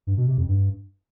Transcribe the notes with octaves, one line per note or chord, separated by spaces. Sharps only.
G2
B2
C3
F2
G2